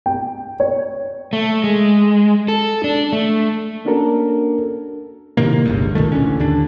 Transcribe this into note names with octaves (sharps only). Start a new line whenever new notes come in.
G5
C#5
A3
G#3
A4
D4
A3
A#3 C#4 D4 F#4 A4 A#4
A2 C3 D#3 A#3
G1 C#2 G2
C#2 A#2 D#3 A3
A1 A2 D3 C#4
D#2 D3 D4